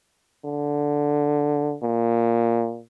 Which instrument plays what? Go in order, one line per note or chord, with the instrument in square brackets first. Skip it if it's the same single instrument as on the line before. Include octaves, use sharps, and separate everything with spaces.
[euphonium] D3
A#2